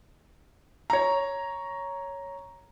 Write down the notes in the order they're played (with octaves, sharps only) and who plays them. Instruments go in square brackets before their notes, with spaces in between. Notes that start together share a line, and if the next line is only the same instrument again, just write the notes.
[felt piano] C#5 A#5